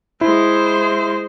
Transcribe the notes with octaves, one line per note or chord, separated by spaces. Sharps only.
G#3 E4 C5